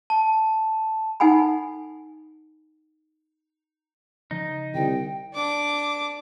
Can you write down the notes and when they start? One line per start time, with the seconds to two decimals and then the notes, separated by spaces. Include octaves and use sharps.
0.10 A5
1.20 D#4 A4 F#5 G#5 B5
4.31 C#3 F3 D#4
4.74 C2 D3 G5
5.34 D4 D6